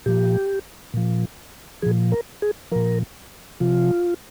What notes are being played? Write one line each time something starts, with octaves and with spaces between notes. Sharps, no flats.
A#2 F3 G4
A#2 F3
A#2 F3 G#4
A#4
G#4
A#2 F3 A#4
C3 F3 F4